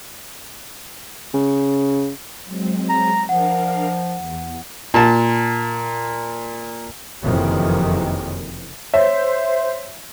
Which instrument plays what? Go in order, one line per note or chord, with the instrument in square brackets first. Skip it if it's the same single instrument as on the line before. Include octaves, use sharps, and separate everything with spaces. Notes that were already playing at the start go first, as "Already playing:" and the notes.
[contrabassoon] C#3
[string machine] F#3 G#3 C4
[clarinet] A#5
[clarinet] F3 [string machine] D4 A#4 F5 [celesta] F#5
[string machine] E2
[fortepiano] A#2 A5
[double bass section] F#1 F2 C3 D#3 E3
[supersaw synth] C5 [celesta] C#5 [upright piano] E5